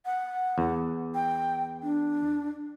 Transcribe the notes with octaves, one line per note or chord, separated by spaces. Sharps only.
F#5
E2
G5
D4